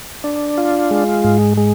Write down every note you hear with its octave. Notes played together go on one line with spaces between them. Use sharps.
D4
F4
G#3
G#2
G#3